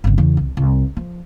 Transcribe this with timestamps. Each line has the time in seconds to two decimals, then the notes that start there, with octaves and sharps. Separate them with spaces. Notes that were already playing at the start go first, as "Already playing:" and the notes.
0.04 G1 C#3
0.18 E2 C#3
0.37 C2
0.57 C2
0.97 F3